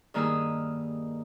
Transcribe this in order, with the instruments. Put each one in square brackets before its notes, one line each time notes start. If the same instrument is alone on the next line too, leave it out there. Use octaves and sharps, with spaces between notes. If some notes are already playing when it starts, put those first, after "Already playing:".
[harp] G2 D#3 A#3 G#4 D#6 E6